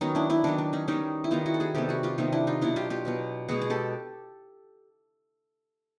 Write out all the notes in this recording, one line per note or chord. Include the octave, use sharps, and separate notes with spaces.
D#3 F#3 B3 C#4 D#4
D4 E4
D4 E4
D#3 F#3 B3 D4
D4
C#4 D#4
D#3 G3 B3 C#4 D#4
E4
D#3 G3 B3 D#4 F4
E4 F#4
A4
F#4 G#4
C3 D#3 G3 B3 G4 A4
F#4 G#4
F4 G4
C3 D#3 G3 B3 D#4 F4
D4 E4
D#4 F4
B2 F#3 B3 D4 E4
F4 G4
F4 G4
B2 F#3 B3
B2 G#3 B3 F#4 G#4
G#4
G4 A4